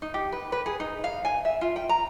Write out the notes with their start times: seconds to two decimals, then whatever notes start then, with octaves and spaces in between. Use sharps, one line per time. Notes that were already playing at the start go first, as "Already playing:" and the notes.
0.02 D#4
0.14 G4
0.32 B4
0.52 B4
0.66 G#4
0.80 D#4
1.04 F5
1.25 G#5
1.45 E5
1.61 F4
1.76 G5
1.89 A#5